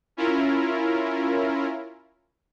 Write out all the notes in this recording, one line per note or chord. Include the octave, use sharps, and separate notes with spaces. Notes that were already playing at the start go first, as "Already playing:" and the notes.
C#4 E4 F4 A#4